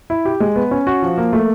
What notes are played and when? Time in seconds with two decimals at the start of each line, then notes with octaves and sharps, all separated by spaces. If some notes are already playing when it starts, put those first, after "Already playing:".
0.10 E4
0.25 G4
0.40 G#3
0.56 B3
0.71 C#4
0.87 F#4
1.02 F3
1.18 A#3
1.33 A3